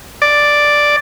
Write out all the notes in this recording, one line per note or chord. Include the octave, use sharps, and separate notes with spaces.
D5